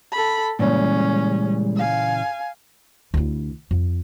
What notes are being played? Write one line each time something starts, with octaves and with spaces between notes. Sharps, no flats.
A4 B5
A#2 C#3 E3 G3 G#3 C#4
F5 G#5
D2 E4
F2